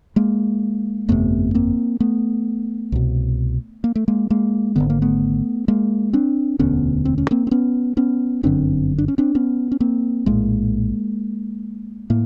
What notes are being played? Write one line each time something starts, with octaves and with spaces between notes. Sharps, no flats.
G#3 A#3
G1 F2 C3 A3 B3
A#3 C4
A3 B3
C2 B2
A#3
A3
G#3 A#3
G#3 A#3
G#1 F#2 D3 B3
A#3
A3 B3
G#3 A#3
C4 D4
E1 D2 D3 B3 C#4
C4
C#4
A#3 C4
C4
B3 C#4
B3 C#4
G1 F#2 D3 C4 D4
D4
C#4
C4 D4
B3 C#4
C#4
A#3 C4
A#1 A2 G#3 A#3
A2 A#3